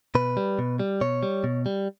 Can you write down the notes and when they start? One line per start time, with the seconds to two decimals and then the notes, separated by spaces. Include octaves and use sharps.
0.15 B2 B4
0.37 G3
0.59 B2
0.79 G3
1.01 B2 C#5
1.23 G3
1.44 B2
1.66 G3